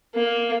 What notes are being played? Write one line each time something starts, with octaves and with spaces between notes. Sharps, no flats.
A#3